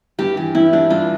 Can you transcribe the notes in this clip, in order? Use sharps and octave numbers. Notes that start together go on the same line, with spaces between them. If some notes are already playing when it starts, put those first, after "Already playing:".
G2 G4
E3 G4
G2 E4
G3 D4
G2 F4